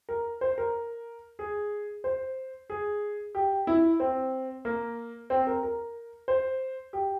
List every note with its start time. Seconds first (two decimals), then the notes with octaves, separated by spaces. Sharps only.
0.09 A#4
0.41 C5
0.58 A#4
1.39 G#4
2.04 C5
2.70 G#4
3.35 G4
3.67 E4
4.00 C4
4.65 A#3
5.30 C4
5.47 A#4
5.63 A#4
6.28 C5
6.93 G4